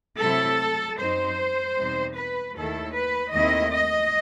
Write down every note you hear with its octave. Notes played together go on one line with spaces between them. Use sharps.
C3 F#3 A3 C4 E4 A4
F#2 F#3 C4 D#4 C5
E2 B2 G3 C4 D#4
B4
D#2 D#3 A3 E4 A4
B4
D#2 D#3 A3 C4 E4 D#5
D#5